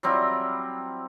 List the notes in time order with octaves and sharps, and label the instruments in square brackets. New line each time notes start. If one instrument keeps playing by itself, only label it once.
[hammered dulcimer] F#3 G3 C4 E4